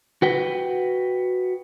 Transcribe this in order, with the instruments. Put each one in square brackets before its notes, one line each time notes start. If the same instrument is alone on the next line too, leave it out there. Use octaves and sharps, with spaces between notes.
[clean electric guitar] F#4 B4 G5